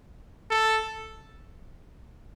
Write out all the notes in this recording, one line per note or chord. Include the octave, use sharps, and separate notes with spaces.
A4